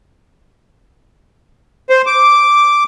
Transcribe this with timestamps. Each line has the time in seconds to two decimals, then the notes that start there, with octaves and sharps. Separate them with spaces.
1.90 C5
2.06 D6